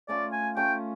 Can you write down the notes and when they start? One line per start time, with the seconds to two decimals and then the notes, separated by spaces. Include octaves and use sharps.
0.08 A3 C#4 F4 D5
0.32 G#5
0.57 A3 C#4 F4 G5